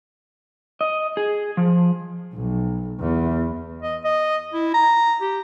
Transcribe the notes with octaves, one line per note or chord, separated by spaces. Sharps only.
D#5
G#4
F3
B1
E2
D#5
D#5
E4
A#5
G4